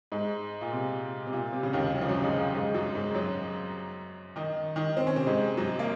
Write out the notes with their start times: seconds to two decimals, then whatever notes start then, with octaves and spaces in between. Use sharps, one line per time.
0.12 G#2 G#3
0.61 A#2
0.73 C3
1.27 C3
1.33 A#2
1.53 C3
1.63 C#3
1.73 D#2 D#3
1.94 F#3
2.01 F3
2.08 F#2 F#3
2.24 G#2 G#3
2.54 G#2 G#3
2.74 F#2 F#3
2.95 G#2 G#3
3.14 F#2 F#3
4.36 D#3 D#4
4.76 D#3 D#4
4.97 C4
5.07 C#4
5.16 C3 C4
5.27 G#2 G#3
5.57 F#2 F#3
5.79 A#3